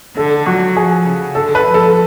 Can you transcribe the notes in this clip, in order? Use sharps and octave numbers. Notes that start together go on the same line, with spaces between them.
D3 A4
F#3 F#4
F3 G#4
C#3
D3 A4
B4
F3
A4